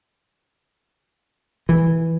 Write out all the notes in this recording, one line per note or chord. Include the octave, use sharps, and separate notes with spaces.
E3